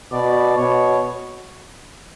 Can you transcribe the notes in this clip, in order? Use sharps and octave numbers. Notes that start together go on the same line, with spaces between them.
B2 D5
B2 C#5